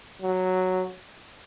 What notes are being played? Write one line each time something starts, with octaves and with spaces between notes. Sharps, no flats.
F#3